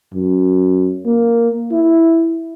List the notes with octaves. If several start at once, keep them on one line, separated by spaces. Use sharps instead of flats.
F#2
A#3
E4